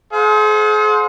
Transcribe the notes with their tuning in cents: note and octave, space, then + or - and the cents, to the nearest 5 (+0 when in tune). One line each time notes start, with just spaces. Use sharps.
G#4 +40 C5 +0 F#5 -45